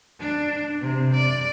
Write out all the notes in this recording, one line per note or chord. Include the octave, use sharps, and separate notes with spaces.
D4
C3
D5